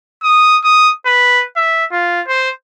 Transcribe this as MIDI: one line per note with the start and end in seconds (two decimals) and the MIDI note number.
0.23 0.58 87
0.64 0.92 87
1.06 1.44 71
1.56 1.85 76
1.92 2.21 65
2.28 2.50 72